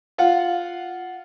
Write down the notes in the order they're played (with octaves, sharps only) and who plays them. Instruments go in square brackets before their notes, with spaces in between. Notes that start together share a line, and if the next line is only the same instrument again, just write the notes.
[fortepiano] F4 F5 F#5